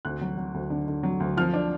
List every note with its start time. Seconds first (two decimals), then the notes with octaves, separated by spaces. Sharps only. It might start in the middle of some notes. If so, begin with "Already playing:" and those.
0.05 D2 F#6
0.21 F#3
0.37 F#3
0.54 D2
0.70 D3
0.88 D3
1.03 F#3
1.20 D2
1.37 F3 F6
1.54 D4